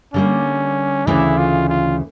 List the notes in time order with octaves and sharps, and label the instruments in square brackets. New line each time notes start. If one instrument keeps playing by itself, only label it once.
[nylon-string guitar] D3 G3 A#3 [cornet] C#4
[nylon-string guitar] D2 C#3 E3 A3 D4 [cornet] E4
[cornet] F4
F4